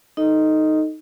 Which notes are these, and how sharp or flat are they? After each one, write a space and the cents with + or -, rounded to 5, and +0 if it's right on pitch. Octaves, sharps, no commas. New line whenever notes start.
D#4 +0 A4 +0 D#5 +0